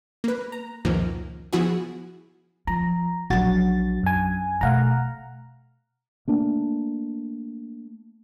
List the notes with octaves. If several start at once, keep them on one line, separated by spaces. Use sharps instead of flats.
A#3 B4
A#5
C#2 F#2 A#2 D#3 F3 A#3
F3 B3 E4 F#4 G#4
F3 A#5
A#1 F#3 D4 F#4 A6
F#2 G#5
B2 A3 F5 F#5 A#5
A3 A#3 D4